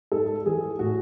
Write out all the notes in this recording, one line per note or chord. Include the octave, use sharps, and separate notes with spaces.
G#2 A4
E3 G#4
A2 F#4